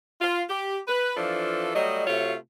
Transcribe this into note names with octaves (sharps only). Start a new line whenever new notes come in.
F4
G4
B4
E3 F3 D4 F4 A4
F#3 G3 A3 D#5
C3 A3 F4 F#4 C#5